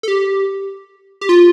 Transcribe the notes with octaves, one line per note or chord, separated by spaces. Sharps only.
A4
G4
G4
F4